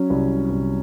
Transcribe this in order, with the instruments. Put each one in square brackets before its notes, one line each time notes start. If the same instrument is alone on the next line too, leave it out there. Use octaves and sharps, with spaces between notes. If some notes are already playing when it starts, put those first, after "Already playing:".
Already playing: [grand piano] F#3 C#4
C2
C2